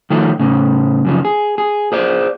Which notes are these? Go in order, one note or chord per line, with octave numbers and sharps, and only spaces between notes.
D#3 F3 A3
A2 C#3
F#2 C#3 F3
G#4
G#4
G#4 C5 D5